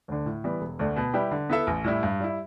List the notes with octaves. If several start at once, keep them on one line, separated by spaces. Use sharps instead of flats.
D2 D3
A2
E3 G3 B3
E1
D2 D3 A3 D4
B2
G3 E4 G4 B4
D3
B3 E4 A4 E5
A1
A2 G3 E4
G2
G3 E4